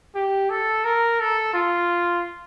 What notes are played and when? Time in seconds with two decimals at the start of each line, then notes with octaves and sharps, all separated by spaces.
0.15 G4
0.50 A4
0.84 A#4
1.20 A4
1.54 F4